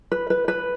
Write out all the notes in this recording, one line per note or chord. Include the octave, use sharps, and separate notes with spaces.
B4
B4
B4